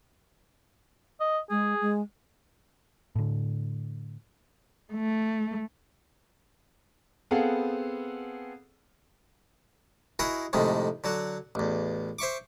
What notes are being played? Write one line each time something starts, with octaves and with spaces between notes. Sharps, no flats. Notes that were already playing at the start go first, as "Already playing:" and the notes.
D#5
G#3 G#4
G#3
A2 D3
A3
B3 C4 G#4 A4 F5 F#5
E4 F#4 G#4 A#4 D#5
F2 A2 C3 D#3 G#3
D3 F#3 F#4
A1 E2
C5 E5 C#6 D6